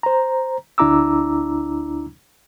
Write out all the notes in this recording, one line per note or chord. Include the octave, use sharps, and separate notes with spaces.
C5 A#5
D2 D4 E4 A#5 D6 E6